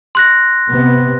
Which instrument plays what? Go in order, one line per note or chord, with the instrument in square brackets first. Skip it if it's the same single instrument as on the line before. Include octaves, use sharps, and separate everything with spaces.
[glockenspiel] C6 F#6 A#6
[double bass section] C3 B3